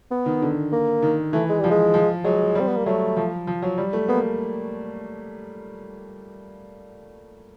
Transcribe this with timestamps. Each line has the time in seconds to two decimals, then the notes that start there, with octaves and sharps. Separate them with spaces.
0.11 B3
0.26 D#3
0.42 D3
0.72 A#3
1.02 D#3
1.33 E3 A3
1.49 G#3
1.60 F3 G3
1.70 G#3
1.94 F3
2.24 F#3 G#3
2.55 G3 C4
2.68 B3
2.77 A#3
2.86 F#3 A3
3.17 F3
3.47 F3
3.62 F#3
3.78 G3
3.93 A3
4.08 A#3 B3